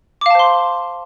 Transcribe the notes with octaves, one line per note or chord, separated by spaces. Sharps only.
C5 F5 A5 C6 D6